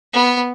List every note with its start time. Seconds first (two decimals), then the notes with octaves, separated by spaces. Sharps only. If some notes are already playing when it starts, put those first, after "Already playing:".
0.13 B3